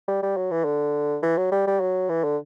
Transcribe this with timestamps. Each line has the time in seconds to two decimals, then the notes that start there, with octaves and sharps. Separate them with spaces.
0.08 G3
0.23 G3
0.37 F#3
0.51 E3
0.65 D3
1.23 E3
1.37 F#3
1.52 G3
1.67 G3
1.80 F#3
2.09 E3
2.24 D3